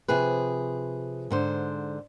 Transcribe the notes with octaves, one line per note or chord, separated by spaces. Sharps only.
C3 F3 G#4 B4
G#2 D3 C5